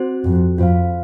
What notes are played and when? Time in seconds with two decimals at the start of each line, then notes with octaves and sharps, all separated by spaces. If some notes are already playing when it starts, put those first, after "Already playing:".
Already playing: C4 F#4 C5
0.24 F2
0.58 F2 F4 C5 F5